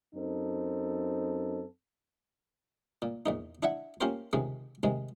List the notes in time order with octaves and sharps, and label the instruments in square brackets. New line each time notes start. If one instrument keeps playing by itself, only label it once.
[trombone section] F#2 C4 D#4 A4
[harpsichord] A#2
A#1 E2 D#4
D4 E4 E5 F#5
A#3 C#4 F4 G4 A#4 C5
C#2 C3 D#3 G#3
G#2 C3 D#3 G#3